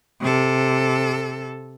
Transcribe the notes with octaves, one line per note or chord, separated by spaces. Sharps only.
C3 A4